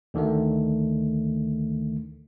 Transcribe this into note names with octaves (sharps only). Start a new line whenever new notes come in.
D2 D3 D#3 A3